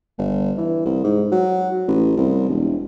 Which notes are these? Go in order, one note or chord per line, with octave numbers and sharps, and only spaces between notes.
G1
E3
C2
G#2
F#3
A1
C2
E1